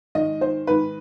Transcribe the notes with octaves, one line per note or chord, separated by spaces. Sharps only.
G#2 D#3 D#5
C5
G#2 D#3 B4